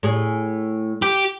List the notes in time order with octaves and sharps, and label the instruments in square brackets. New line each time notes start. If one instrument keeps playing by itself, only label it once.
[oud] A2 G#4
[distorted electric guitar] G4